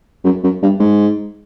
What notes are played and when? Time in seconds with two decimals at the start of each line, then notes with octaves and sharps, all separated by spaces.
0.25 F#2
0.44 F#2
0.63 G2
0.80 G#2